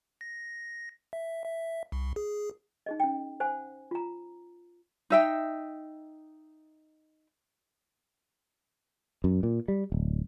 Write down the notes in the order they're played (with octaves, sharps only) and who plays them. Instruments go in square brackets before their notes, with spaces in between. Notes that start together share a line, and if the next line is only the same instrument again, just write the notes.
[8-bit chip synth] A#6
E5
E5
C2
G#4
[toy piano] D#4 G#4 D#5
C#4 G5
C5 F#5 G#5
F4 A#5
[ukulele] D#4 E5 G5
[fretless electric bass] F#2
A#2
G3
D1